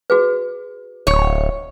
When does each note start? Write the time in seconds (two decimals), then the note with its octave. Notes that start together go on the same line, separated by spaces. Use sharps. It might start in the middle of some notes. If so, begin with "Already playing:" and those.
0.10 F#4 G#4 B4
1.07 D1 C#5